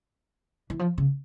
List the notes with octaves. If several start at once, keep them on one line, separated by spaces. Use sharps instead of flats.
E3
F3
C#3